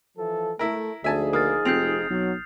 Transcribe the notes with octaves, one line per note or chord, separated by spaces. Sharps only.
E3 F3 A4
A3 E4 A#4
D2 F3 D#4 G#4 E5 G#5 A5
A#3 D#6 F6 A6
F1 C4 G6 C7 F7
B1 F#3